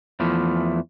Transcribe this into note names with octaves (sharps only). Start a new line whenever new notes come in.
E2 E3 F3 A3